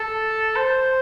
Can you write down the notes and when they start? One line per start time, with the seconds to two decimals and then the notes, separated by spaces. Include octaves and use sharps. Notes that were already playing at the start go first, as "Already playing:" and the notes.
Already playing: A4
0.56 C5